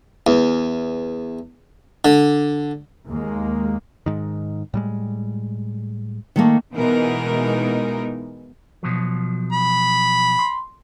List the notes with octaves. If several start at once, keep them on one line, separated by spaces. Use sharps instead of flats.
E2
D3
D#2 G#3 A#3
G#2 D#3
A2 G3 G#3
D#3 A3 A#3
B2 E3 G#3 B3 D#4 A#4
B2 F3 F#3
B5
C6